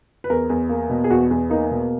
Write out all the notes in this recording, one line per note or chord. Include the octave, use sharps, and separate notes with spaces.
B4
E2 A#4
E2
A#3
B2
G#4
E2 F#4
E2
A#3 D#4
B2